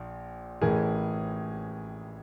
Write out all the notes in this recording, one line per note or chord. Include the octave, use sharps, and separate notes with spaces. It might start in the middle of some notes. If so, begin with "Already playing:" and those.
Already playing: A#1 A#2
A1 A2 E3 G#4 A#4